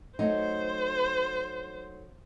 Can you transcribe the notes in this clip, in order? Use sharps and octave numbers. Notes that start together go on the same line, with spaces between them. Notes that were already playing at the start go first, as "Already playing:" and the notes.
F#3 A3 D#4 C5